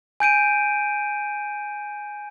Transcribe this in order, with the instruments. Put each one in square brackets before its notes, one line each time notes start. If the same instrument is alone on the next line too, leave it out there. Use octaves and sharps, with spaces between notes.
[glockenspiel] G#5 G6 D7 D#7